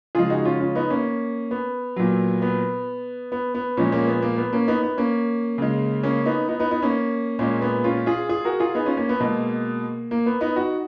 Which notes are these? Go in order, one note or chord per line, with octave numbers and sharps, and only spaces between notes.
C#3 F3 G#3 F4 G#4
D#4 F#4
C#4 F4
C#4 F4
B3 D#4
A#3 C#4
B3
A#2 F#3
B3
B3
B3
A#2 F3 G#3 A#3 C#4
A#3 C#4
B3
A#3
B3
A#3 C#4
B3 D#4
B3
A#3 C#4
C#3 G#3
A#3 C#4
B3 D#4
B3 D#4
B3 D#4
B3 D#4
A#3 C#4
A#2 G#3 A#3 C#4
B3
C#4 F4
F4 G#4
F4 G#4
F#4 A#4
F4 G#4
B3 D#4
C#4 F4
A#3 C#4
B3
B2 G#3 A#3
A#3
B3
B3 D#4
D#4 F#4